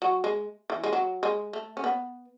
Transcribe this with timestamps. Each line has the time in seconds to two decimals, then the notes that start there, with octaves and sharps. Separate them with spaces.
0.02 F#3 F#4
0.24 G#3
0.70 E3
0.84 G#3
0.93 F#3
1.23 G#3
1.53 A3
1.77 C#4
1.84 B3